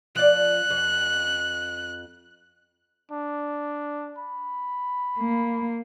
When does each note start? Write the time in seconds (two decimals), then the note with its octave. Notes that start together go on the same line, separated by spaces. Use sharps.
0.16 F3 D5 F#6
0.70 F2
3.12 D4
4.19 B5
5.20 A#3